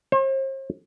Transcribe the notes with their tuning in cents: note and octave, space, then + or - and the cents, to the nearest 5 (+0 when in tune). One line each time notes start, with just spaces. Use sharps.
C5 +40